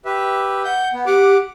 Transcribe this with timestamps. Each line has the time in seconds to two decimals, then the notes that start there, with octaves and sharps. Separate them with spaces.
0.05 G4 B4 E5
0.64 F#5 G6
0.93 B3
1.06 G4 F#5 D6